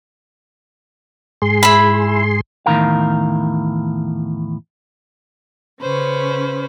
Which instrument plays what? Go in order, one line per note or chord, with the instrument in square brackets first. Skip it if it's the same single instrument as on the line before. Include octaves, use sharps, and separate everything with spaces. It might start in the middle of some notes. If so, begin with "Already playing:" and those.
[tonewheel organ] G#2 G#4 C6
[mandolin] E4 B5
[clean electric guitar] E2 A2 C3 D#3 A#4 F5
[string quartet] C#3 C#4 B4 C5